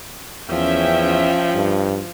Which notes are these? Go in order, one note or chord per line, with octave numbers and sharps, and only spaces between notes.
E2 F3 C#4 E5 G5
G2